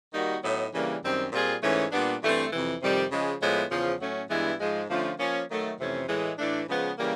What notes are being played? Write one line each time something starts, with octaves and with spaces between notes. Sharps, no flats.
D#3 G3 A#3 D#4 F#4
A2 F#3 B3 D#4
C#3 E3 G3 A#3 D4
F#2 D#3 G3 C4
A#2 G3 C4 F4 G#4
G#2 E3 A3 C#4
A#2 G3 B3 D4
G2 E3 A3 C4
F2 C3 E3
F2 C3 D#3 G3
C#3 F3 G#3
A2 F3 G#3 B3 E4
E2 C#3 F3
A2 F#3 A3 C#4
G2 E3 G#3 B3 E4
G#2 F3 G#3
D3 F3 A3 C#4 F4
F3 A#3 C#4
D#3 F#3 A3
F2 C3 E3 A3 C#4
A2 E3 G#3
A2 E3 A3 D4
C#3 F3 G#3 B3
C#3 E3 G3 A#3